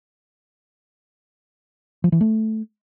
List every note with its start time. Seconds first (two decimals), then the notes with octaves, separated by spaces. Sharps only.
2.04 F3
2.12 E3
2.21 A3